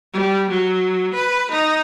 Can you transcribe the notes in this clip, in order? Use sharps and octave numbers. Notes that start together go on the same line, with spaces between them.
G3
F#3
B4
D#4